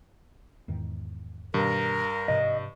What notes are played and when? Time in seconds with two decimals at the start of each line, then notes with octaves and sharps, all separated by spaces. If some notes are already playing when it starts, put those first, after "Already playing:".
0.68 E2 G#2 D#3
1.54 G2 B2 D#3 A#4
2.28 G#2 C3 F3 D#5